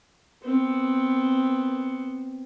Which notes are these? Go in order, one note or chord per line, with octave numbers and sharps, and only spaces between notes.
B3 C4